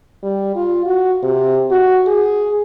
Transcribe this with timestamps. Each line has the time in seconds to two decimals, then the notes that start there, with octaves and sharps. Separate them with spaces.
0.23 G3
0.56 F4
0.86 F#4
1.23 C3
1.71 F#4
2.07 G#4